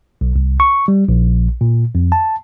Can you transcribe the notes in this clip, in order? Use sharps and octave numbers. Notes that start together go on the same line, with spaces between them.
B1
C2
C#6
G3
A#1
A#2
F2
A5